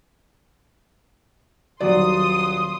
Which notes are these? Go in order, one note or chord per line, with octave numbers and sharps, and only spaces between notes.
D#1 F#3 D5 C6 D#6